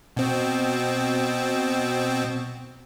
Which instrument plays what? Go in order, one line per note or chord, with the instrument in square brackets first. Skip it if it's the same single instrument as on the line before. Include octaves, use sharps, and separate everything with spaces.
[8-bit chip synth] B2 C4